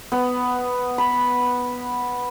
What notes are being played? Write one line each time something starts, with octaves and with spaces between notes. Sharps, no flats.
B3
B5